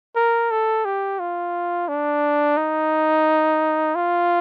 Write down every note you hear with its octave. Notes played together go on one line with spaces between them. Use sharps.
A#4
A4
G4
F4
D4
D#4
F4